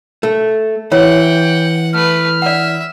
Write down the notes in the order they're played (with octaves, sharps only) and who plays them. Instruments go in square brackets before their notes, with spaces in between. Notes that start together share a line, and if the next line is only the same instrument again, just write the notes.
[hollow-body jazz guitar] A3
[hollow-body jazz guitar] E3 [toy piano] C#5 [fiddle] F#5 [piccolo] G5
[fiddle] A3 B4 [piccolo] F6
[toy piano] D5 F#5 [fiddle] E5